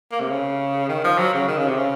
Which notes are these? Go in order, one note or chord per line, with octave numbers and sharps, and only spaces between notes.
A#3
C3
C#3
D#3
F3
F#3
C#3
D#3
C#3
C3
C#3